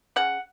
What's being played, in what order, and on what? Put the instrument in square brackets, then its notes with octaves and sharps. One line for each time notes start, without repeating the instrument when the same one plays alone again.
[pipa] C#3 F#5